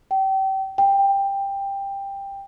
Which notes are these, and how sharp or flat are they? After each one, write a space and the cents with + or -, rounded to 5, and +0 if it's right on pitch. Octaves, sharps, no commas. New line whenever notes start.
G5 -30
G5 +15